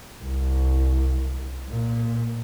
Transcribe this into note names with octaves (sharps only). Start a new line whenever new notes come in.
C2
A#2